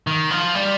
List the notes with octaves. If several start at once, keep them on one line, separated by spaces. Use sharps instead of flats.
D#3
F3
G3